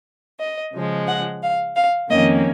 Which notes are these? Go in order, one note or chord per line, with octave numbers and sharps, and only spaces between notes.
D#5
C#3 F3 G#3
F#5
F5
F5
F2 D#3 A#3 C#4 D#5